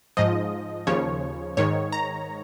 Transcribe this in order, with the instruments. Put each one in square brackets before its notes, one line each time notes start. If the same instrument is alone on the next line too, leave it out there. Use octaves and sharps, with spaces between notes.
[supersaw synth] G#2 F3 D#5
D#2 C#3 F3 C#5
G#2 D#3 C#5
A#5